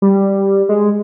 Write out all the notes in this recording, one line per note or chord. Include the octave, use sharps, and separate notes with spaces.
G3
G#3